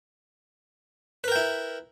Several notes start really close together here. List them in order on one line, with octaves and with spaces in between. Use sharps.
B4 A#4 G5 E4